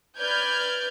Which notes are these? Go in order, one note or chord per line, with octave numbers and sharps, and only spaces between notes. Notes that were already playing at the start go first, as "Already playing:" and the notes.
B4 D5 F6 G6 G#6